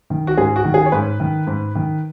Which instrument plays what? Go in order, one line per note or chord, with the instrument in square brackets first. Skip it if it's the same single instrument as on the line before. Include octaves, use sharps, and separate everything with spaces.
[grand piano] D#3
F#4
G#2 G#4
F#4
D#3
G#4
C#5
G#2 B4
D#3
G#2
D#3